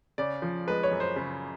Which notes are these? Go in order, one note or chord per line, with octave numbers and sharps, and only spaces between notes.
C#3 D5
F3
G#3 B4
C#5
F#2
C5
C#3